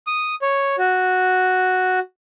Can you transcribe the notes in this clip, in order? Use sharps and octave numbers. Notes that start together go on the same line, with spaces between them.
D#6
C#5
F#4